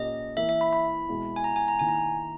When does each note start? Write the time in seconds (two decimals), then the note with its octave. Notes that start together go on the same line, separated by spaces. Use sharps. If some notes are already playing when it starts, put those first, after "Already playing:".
Already playing: A#2 A#3 C#4 G4 D#5
0.37 E3 A#3 E4 A#4 E5
0.49 E5
0.61 B5
0.73 B5
1.09 B2 G#3 B3 E4
1.36 G#5
1.44 A#5
1.56 G#5
1.68 A#5
1.79 D#3 A#3 E4 A#4 G#5
1.89 A#5